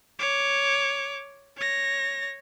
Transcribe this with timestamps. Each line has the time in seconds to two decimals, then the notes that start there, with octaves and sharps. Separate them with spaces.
0.19 C#5 D6
1.57 C#5 A#6